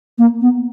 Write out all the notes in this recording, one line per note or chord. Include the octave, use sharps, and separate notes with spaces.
A#3
B3